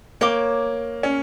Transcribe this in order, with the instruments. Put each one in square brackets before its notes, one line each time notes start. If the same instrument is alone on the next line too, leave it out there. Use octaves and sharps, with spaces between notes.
[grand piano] A#3 [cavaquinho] C#5 G5 D6
[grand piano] C#4